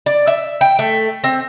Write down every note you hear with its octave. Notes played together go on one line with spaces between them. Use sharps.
D5
E5
G5
A3
C4